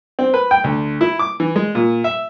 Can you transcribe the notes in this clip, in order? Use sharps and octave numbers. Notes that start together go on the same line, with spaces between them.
C4
B4
G5
D2
E4
D6
E3
G#3
A#2
E5